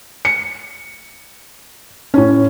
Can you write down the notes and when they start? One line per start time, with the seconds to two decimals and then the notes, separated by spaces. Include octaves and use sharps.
0.25 C#7
2.14 A2 C#4